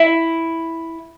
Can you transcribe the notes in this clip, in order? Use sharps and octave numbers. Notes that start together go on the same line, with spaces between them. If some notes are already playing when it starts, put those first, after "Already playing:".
Already playing: E4